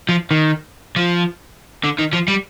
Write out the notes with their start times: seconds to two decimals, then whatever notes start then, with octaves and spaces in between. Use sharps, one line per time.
0.09 F3
0.31 D#3
0.96 F3
1.84 D3
1.99 D#3
2.13 F3
2.28 G3